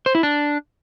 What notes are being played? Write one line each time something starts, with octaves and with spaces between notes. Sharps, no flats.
C5
E4
D4